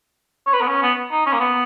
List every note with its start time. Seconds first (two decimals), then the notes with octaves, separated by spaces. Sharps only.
0.47 C#5
0.54 B4
0.61 B3
0.68 C#4
0.82 B3
1.11 D#4
1.27 C#4
1.33 A#3
1.40 B3